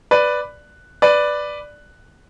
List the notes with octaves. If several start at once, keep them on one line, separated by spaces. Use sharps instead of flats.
B4 D5
B4 D5